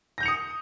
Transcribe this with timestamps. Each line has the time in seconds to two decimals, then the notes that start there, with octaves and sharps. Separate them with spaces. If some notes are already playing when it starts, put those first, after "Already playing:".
0.18 A#6
0.20 G6
0.23 F7
0.26 C#7
0.28 D#6